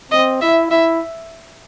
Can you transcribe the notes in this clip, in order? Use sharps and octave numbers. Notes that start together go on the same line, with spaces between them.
C4 D#5
E4 E5
E4 E5